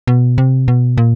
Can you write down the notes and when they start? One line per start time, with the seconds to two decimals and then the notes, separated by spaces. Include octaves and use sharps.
0.07 B2
0.38 C3
0.68 B2
0.98 A#2